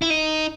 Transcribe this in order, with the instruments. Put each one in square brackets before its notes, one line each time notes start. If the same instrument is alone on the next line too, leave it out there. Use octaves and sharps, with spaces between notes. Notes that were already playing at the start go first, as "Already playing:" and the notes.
[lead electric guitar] E4
D#4